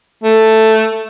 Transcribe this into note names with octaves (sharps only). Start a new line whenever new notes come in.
A3